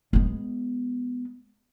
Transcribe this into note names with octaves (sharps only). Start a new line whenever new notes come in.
G#3 B3